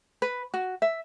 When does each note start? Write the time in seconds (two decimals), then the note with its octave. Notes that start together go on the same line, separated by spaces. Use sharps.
0.22 B4
0.54 F#4
0.82 E5